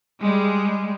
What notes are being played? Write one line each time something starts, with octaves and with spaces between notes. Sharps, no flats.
G3 G#3